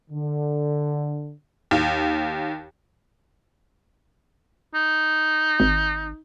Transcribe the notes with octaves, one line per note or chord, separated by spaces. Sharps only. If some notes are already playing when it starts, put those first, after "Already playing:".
D3
D#2
D#4
G#1